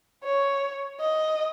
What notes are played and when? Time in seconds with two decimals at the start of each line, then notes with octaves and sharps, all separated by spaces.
0.24 C#5
1.00 D#5